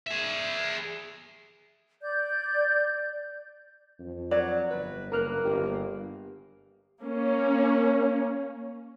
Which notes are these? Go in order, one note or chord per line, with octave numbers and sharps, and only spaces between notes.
G#4 E5
D5 G6
F2
F#3 D5
G1 B4
F#1 A#3 A#4 F6 F#6
G1 G4
A#3 C#4